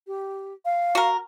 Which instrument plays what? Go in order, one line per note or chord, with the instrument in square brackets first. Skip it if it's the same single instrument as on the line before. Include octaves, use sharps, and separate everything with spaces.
[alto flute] G4
F5
[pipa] F#4 A#4